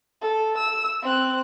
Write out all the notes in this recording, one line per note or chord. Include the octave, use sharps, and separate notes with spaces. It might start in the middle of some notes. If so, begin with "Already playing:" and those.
A4
E6
C4 F#6